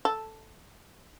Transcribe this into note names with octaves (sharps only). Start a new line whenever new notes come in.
A4